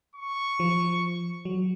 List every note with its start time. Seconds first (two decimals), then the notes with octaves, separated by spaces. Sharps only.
0.15 C#6
0.60 F3
1.45 F#3